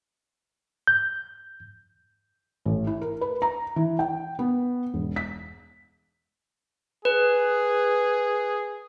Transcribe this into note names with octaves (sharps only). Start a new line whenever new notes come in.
G6
A1
E4
A#4
B4
A#5
E3
G5
B3
E1
B6
G#4 B4